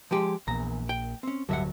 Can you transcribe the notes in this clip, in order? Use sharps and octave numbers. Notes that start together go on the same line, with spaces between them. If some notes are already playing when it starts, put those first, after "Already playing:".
F3 G#3 G4
A#1 E2 A#2 A#5
G5
C4 C#4
D1 G2 D3 F#3 E5 F#5